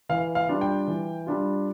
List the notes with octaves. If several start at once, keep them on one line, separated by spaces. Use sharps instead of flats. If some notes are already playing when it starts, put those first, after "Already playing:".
E3 F5
F5
G3 D4 F4
G5
E3
G3 D4 F4